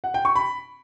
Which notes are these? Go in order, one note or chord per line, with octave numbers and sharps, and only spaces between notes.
F#5
G5
C#6
B5